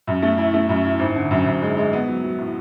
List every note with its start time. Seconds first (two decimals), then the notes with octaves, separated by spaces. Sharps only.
0.07 F#2
0.22 A3
0.38 E4
0.54 A3
0.69 F#2
0.85 E4
0.99 G#1
1.15 D3
1.31 F#2
1.46 F#2
1.62 G#3
1.77 G#3
1.93 B3
2.08 F#3
2.24 F#3
2.39 A2